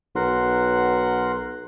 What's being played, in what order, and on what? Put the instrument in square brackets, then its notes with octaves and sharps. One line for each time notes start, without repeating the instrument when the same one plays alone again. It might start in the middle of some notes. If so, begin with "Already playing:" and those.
[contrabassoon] B1 [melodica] A#4 F#5 C6